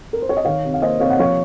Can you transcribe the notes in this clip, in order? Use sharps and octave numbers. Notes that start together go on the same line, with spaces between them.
A#4
C5
C#5
D#5
D#3 C#5 F5
C3
F5
A#3 C5 D#5
C3 C#5 F5
F#5
F3 C#5 F5